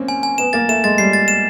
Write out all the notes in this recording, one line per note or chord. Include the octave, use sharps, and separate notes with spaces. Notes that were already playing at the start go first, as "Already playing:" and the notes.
Already playing: A#3 C4 C#4
G#5
G#5
B3 E7
A#3 A6
A3 E7
G#3 A6
G3 C7
A6
E7